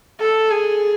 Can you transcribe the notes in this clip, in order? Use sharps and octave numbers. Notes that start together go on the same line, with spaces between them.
A4
G#4